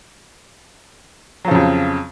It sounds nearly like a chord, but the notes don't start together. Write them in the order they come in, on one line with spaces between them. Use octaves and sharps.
F#3 F3 C#3 F2